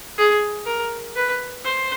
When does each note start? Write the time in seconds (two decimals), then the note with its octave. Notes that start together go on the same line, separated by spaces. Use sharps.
0.18 G#4
0.66 A#4
1.16 B4
1.64 C5